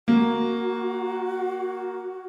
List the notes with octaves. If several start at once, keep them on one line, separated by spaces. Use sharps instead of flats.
A#3 F#4